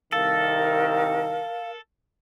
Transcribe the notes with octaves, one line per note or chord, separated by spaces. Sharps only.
C2 D#3 A4 A#4 F5